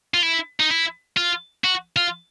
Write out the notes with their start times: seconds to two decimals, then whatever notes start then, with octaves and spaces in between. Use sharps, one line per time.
0.14 F4
0.22 E4
0.60 D#4
0.70 E4
1.17 F4
1.64 F#4
1.96 F4